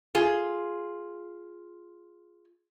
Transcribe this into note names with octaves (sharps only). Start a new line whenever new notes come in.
F4 G#4